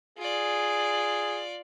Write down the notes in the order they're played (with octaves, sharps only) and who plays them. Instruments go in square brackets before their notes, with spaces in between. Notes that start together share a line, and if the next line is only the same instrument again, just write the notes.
[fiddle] F4 D5 [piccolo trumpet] G#4